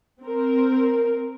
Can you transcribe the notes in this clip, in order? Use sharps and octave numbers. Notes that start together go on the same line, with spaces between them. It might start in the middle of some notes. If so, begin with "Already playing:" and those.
C4 A#4